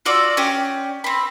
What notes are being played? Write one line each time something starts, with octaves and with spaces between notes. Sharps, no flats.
F4 F#4 D5 E6
C#4 G4
C4 B5